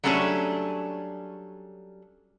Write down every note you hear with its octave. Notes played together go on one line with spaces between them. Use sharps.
F#3 G3 A3 C#4 D4 G#4